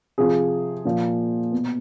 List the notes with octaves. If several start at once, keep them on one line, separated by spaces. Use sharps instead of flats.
C3 F3 G#4
A#2 F3
B2